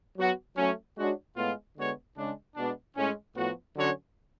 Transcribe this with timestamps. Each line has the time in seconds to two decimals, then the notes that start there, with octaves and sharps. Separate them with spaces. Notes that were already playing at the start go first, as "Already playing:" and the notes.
0.17 F#3 B3 F#4
0.57 F#3 A3 C#4
0.97 G#3 D4 F#4 C#5
1.37 A2 G#3 B3 F4
1.77 D3 G#3 B3 F#4 C#5
2.16 C#3 G#3 D4
2.56 B2 G#3 B3 D4
2.96 A2 G#3 C#4
3.36 A2 F3 B3 F#4
3.76 D3 F#3 C#4 F#4 C#5